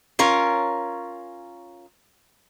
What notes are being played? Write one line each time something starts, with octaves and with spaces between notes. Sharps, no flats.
C#4 F4 A#4 C#5